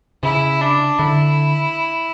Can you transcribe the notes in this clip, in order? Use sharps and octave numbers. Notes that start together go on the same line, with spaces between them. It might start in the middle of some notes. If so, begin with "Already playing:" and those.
C#3 E4
D4
D3 E4